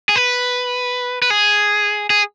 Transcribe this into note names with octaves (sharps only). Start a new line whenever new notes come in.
G#4
B4
B4
G#4
G#4